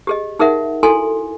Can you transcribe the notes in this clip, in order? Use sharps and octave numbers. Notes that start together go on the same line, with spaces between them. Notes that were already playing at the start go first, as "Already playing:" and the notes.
G4 G#4 D#5
D#4 G#4 A#4 E5 F#5
E4 F#4 A4 G5 G#5 C6